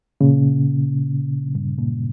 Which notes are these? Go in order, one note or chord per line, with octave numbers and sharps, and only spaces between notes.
A#2 C#3
G2
A#2